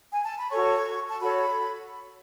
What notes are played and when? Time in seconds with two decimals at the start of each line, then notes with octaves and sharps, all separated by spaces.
0.12 G#5
0.24 A5
0.37 B5
0.50 F#4 A4 C#5 C#6
1.09 A5
1.19 F#4 A4 C#5 B5